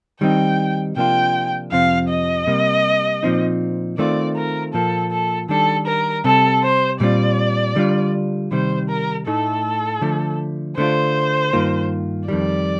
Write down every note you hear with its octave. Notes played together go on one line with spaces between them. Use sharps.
D#3 G3 C4 D#4 G5
C3 F3 A#3 D4 F4 G5
F2 C3 F3 C4 F5
D#5
C3 G3 A#3
A#2 F3 C4 D#4
D#3 A3 C4 F4 D5
A#4
A#2 F3 A#3 A4
A4
D#3 G3 D4 A4
A#4
C3 G3 C4 A4
C5
A#2 G3 C4 F4 D5
D3 G3 D4 F4
C3 D#3 G3 C5
A#4
A2 A3 D#4 A4
D3 F3 A3
D3 A3 D4 F4 C5
G2 D#3 A#3 F4
F2 D#3 G3 D5